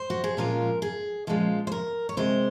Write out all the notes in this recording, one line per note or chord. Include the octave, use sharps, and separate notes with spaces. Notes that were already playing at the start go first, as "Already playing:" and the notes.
Already playing: C5
F#4
G#4
A#2 F3 G#3 C#4 F4 A#4
G#4
A#2 F3 G#3 C#4 F4
C5
A#4
C#5
C3 D#3 G#3 C5